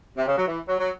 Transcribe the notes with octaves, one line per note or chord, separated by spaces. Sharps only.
C3
C#3
F#3
E3
F#3
F#3